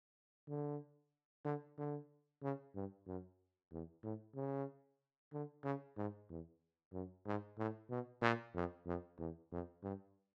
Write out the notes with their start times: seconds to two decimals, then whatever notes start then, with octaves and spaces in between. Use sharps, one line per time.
0.48 D3
1.45 D3
1.78 D3
2.42 C#3
2.75 G2
3.07 F#2
3.72 E2
4.03 A2
4.35 C#3
5.33 D3
5.64 C#3
5.97 G#2
6.29 E2
6.93 F#2
7.26 G#2
7.58 A2
7.90 B2
8.22 A#2
8.55 F2
8.86 F2
9.19 E2
9.52 F2
9.83 G2